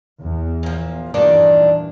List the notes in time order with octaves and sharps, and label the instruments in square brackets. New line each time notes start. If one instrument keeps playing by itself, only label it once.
[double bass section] E2
[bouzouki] A#2 F3
[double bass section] G2 A#2 E3 [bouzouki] D#3 A#3 D4